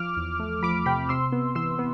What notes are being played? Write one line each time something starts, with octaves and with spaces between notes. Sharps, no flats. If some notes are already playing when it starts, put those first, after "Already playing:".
Already playing: F3 D6 F6
E2
A3
F3 B5 D6
C3 G5 B5
C3 C6 E6
B3
E3 C6 E6
B3